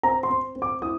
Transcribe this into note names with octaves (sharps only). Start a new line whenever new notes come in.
C4 A#5
C6
C4
C4
D6
E4 D#6